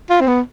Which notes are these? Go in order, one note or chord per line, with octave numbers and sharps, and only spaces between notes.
F4
C4
B3